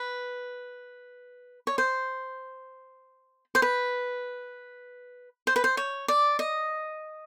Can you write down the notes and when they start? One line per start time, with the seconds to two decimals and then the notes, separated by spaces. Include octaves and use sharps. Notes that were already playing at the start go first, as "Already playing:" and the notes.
Already playing: B4
1.67 C#5
1.78 C5
3.55 C5
3.62 B4
5.47 C5
5.56 B4
5.64 C5
5.77 C#5
6.08 D5
6.39 D#5